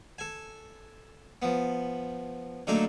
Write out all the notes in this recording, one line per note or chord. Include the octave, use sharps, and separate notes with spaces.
A4 G#5
F3 B3
D3 F#3 A3 A#3 D#4 A4